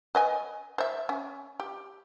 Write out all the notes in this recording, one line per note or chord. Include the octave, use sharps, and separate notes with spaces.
B4 D#5 G#5
C5 E5
C#4
G4